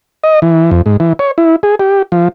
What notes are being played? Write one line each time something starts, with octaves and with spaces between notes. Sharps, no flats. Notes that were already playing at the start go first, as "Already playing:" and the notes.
D#5
E3
F2
G#2
E3
C#5
E4
G#4
G4
F3